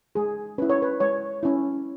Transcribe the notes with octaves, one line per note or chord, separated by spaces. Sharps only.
G#3 G#4
C#4 E4 B4
C#5
B4
G#3 C#5
C#4 E4